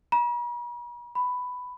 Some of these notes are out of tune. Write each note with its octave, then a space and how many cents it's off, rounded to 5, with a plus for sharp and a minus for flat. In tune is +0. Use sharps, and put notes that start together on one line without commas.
B5 -45
B5 +10